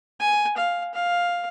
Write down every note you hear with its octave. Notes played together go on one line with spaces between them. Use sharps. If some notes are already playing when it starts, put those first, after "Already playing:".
G#5
F5
F5